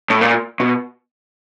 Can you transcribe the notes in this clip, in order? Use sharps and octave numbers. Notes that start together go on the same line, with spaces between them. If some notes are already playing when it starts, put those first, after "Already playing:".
A2
A#2
B2